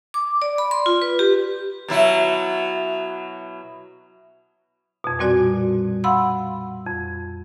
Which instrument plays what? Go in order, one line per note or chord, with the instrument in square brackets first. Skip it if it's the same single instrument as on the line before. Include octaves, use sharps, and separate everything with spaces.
[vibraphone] D6
D5
B5
C6
F4
B4
G4
[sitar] B2 F#3 E4
[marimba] F2 B2
A#2 G3 C4 F#4 D5 G#5
F5 F#5 B5 C6 E6
F2